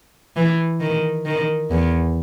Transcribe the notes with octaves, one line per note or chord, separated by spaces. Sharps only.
E3
D#3
D#3
E2